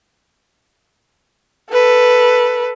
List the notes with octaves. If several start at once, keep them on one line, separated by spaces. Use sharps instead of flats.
A4 B4